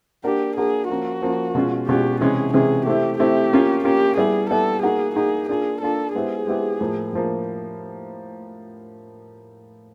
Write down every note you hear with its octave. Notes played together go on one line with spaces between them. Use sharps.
A#3 D4 F#4 G4 A#4
A#3 D4 F#4 G#4 A#4
F3 A#3 C#4 F#4
F3 A#3 C#4
B2 G#3 C#4 F4
B2 G#3 C#4 F4 G4
C3 E3 G#3 C#4 G#4
C3 E3 G#3 C#4 G#4
A3 C4 E4 G4
A3 C4 E4 G4
A#3 C#4 F4
A#3 C#4 F4 G4
G3 B3 E4 G#4
G3 B3 E4 A4
A#3 D#4 F#4 G#4
A#3 D#4 F#4 G#4
A#3 D4 F4 G#4
A#3 D4 F4 A4
G#3 B3 E4 G4 G#4 C5
G#3 B3 E4 G4 C5
A2 F3 A#3
A2 F3 A#3